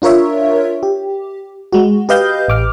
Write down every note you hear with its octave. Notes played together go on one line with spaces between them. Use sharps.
D4 F4 A#4 C#5 E5
G4
G#3 F#4
G4 B4 D#5 F5 G6
A1 D6 F6